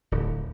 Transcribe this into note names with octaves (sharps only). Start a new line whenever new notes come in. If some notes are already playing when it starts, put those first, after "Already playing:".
D1